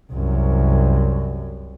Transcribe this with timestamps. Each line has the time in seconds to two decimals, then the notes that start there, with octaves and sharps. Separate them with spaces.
0.12 C2 F#2